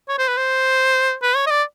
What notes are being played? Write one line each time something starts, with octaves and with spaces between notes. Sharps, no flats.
C#5
C5
B4
C5
B4
C#5
D#5
D5